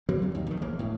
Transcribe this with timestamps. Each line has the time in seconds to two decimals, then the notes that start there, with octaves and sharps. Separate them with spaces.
0.09 F#3 G3 A#3 C4
0.21 A#1 G2 A#2
0.35 D#2
0.47 A#1 D#3
0.62 E1 E3 A#3
0.79 A2